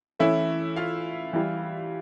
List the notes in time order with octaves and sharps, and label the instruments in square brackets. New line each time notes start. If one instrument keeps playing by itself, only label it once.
[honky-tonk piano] E3 A3 C#4 [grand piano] E4 E5
[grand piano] F4 F5
[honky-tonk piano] E3 G3